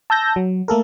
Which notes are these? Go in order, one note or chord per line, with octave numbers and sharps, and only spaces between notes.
A5 E6 G6 A#6
F#3
A3 A#3 A4 A#4